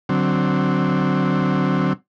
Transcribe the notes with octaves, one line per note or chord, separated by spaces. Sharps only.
D3 F#3 C4